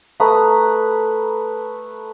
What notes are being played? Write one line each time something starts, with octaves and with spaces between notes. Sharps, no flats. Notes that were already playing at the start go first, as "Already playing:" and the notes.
A3 B4 A#5 D#6